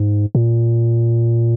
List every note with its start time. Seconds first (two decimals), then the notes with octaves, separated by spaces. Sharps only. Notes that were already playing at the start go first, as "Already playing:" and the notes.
Already playing: G#2
0.35 A#2